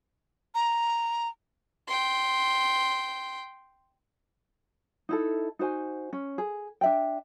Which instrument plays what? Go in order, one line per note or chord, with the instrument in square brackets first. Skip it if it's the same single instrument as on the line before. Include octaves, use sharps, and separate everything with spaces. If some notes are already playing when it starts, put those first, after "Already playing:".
[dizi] A#5
[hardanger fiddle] G5 C6
[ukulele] D#4 E4 A4
D#4 F#4 C5 G#5
C#4
G#4
D4 E5 G5